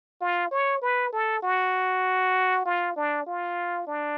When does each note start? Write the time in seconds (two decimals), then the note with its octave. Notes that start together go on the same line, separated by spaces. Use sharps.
0.21 F4
0.51 C#5
0.82 B4
1.13 A4
1.42 F#4
2.65 F4
2.96 D4
3.26 F4
3.87 D4